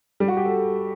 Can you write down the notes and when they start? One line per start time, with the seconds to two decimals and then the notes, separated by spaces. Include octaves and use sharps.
0.20 G3
0.28 F#4
0.37 G4
0.45 A4